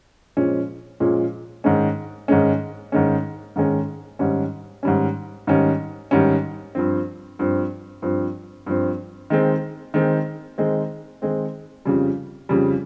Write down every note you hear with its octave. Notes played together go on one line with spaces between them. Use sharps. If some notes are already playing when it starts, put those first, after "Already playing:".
A#2 F3 G#3 C#4
A#2 F3 G#3 C#4
G#2 D#3 G#3 C#4
G#2 D#3 G#3 C#4
G#2 D#3 G#3 C#4
G#2 D#3 G#3 C#4
G#2 D#3 G3 C#4
G#2 D#3 G3 C#4
G#2 D#3 G3 C#4
G#2 D#3 G3 C#4
G2 F3 C4
G2 F3 C4
G2 F3 C4
G2 F3 C4
D#3 G#3 C4
D#3 G#3 C4
D#3 G#3 C4
D#3 G#3 C4
F2 C#3 G3
F2 C#3 G3